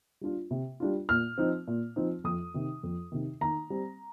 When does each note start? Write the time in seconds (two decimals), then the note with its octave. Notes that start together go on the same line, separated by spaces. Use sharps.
0.21 G3 D4 F4
0.51 C3
0.80 G3 D4 F4
1.09 A#2 F6
1.38 F3 C4 D#4
1.67 A#2
1.96 F3 C4 D#4
2.24 F2 D#6
2.54 C3 D#3
2.83 F2
3.12 C3 D#3
3.41 D#3 A#5
3.70 G3 C4